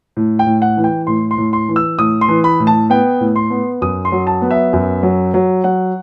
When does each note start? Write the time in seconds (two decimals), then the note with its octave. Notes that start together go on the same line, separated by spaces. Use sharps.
0.17 A2
0.39 G5
0.47 A2
0.62 F#5
0.77 E3
0.84 G5
1.07 A2 C6
1.31 C6
1.38 A2
1.53 C6
1.69 E3
1.76 E6
1.98 A2 D#6
2.21 C6
2.29 E3
2.44 B5
2.60 A2
2.67 A5
2.90 B3 G5
3.21 A2
3.36 C6
3.50 B3
3.82 F#2 D#6
4.05 C6
4.12 F#3
4.27 A5
4.42 B3
4.51 E5
4.73 F#2
5.03 F#3
5.34 F#3
5.64 F#3 F#5